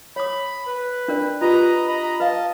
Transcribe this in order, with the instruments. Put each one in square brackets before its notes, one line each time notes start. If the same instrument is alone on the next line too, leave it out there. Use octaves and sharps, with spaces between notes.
[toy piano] C#5 D#6 [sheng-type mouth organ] B5
[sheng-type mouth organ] B4
[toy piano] D4 A#4 D5
[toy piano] F4 G4 [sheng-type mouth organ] B4 D#5 A#5
[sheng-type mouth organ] D#5 A#5 B5
[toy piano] B4 F5 [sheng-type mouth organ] D#5 A5